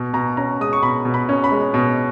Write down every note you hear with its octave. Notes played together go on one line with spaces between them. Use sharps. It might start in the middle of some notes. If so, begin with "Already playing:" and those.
Already playing: B2
B2 A#5
C#4 A#5
G#3 D#6
C#6
B2 B5
B2
B5
C#4
B5
G#3
B2